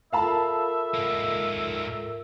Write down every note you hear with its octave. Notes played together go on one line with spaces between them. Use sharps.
F4 A4 A#4 E5 F5 A5 B5
G#2 A#3